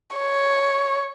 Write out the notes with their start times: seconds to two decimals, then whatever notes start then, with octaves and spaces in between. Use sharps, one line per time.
0.16 C#5